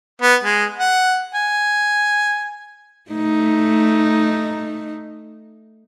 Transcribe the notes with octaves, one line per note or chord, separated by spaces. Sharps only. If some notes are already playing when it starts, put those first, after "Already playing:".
B3
G#3
F#5
G#5
A3 D#4